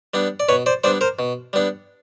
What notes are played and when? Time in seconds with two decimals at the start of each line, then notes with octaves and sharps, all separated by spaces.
0.14 G3 B3 D4
0.40 D5
0.49 B2 B4 C#5
0.66 C5 D5
0.84 G3 B3 D4 C5 D5
1.01 A#4 C5
1.19 B2
1.53 G3 B3 D4